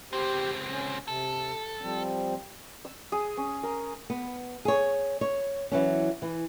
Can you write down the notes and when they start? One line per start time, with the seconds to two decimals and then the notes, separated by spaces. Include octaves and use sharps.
0.13 C#2 C4 G4 C5
0.71 C#4
1.08 C3 A4
1.81 F3 G3 C4
2.85 E6
3.12 G#4
3.37 C#4
3.63 A#4
4.10 B3
4.65 G#4 C#5
5.21 C#5
5.72 E3 F#3 C#4
6.22 E3